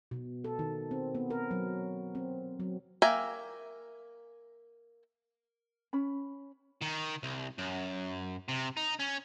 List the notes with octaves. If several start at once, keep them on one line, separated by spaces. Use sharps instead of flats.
B2
A4
D#3
C4
B3
A#4
F#3
C4
F#3
A#3 E5 G5 G#5 A#5
C#4 B5
D#3
C2
F#2
C3
D#4
C#4